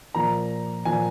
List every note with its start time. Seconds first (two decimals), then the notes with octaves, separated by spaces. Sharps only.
0.15 A#2 F3 A#3 A#5
0.85 A#2 F3 A#3 G#5